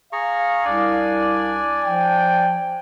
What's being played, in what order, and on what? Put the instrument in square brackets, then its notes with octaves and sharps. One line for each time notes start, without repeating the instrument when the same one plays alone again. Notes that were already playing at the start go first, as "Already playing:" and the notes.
[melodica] G#4 A#5 C#6 [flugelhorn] F5
[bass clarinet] C2 [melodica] D4 D5 G#5
[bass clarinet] F3 [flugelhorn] G5